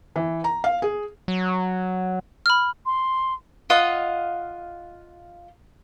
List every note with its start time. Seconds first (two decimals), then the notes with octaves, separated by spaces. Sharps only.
0.16 E3
0.44 A#5
0.64 F5
0.82 G#4
1.28 F#3
2.46 B5 F6
2.86 C6
3.70 F4 D#5 F5 F#5